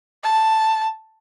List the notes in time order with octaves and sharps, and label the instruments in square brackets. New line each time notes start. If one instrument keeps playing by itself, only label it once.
[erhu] A5